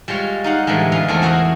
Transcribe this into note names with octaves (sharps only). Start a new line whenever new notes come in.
G3 G#3 F4 C#5
D#4 F5 F#5
A2 D3 E3 G3 G#3
C#3 B3 F5 A#5
E2 A3 C4 A#4
C#4 E4 F#4 G#4 A#4 C5